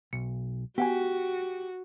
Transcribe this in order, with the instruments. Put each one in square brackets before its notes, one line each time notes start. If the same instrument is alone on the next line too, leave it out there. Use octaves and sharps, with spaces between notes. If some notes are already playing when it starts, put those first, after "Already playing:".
[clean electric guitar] B1 [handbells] C#7
[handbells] B3 F#5 G#5 [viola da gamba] F#4 [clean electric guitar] G4